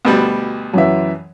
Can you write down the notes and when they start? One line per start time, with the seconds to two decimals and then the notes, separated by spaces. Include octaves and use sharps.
0.05 D2 B2 G3
0.74 F#2 E3 E5